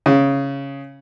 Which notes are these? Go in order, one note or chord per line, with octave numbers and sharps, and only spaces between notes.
C#3